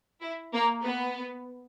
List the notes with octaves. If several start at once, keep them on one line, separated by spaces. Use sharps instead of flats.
E4
A#3
B3